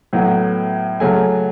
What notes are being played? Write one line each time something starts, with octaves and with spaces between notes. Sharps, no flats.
A2 F#3 B3
C#3 F#3 A3 G#5